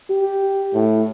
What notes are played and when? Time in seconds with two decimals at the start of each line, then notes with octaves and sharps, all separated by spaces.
0.10 G4
0.74 A2